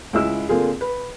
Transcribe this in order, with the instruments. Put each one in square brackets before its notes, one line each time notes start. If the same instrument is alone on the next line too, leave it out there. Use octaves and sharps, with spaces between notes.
[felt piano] C#2 G#3 E4 E6
D3 A#3 C4 F4 G#4
B4